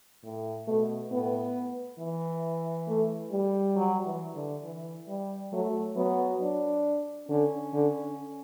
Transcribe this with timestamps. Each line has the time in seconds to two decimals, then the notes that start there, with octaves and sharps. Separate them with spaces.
0.24 A2
0.68 B2 A3
1.11 A2 B3
1.99 E3
2.88 A3
3.32 G3
3.76 F#3
4.06 E3
4.35 D3
4.64 E3
5.08 G3
5.53 F#3 A3
5.96 F#3 B3
6.41 D4
7.29 D3 C#4
7.73 D3